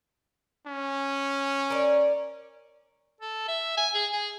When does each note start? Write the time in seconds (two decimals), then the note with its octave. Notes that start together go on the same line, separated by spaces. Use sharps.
0.66 C#4
1.70 A#4 D5
3.21 A4
3.48 E5
3.78 G#5
3.95 G#4
4.13 G#4